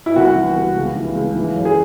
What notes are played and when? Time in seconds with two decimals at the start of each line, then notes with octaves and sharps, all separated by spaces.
0.06 E4
0.16 C2 F#4
0.36 E3
0.56 C2
0.76 C#2
0.96 E3
1.15 C#2
1.35 E3
1.56 F#2
1.65 G#4